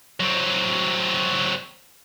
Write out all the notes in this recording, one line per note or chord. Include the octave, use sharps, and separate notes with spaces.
F#3 C4